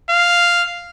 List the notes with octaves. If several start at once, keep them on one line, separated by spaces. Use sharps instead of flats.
F5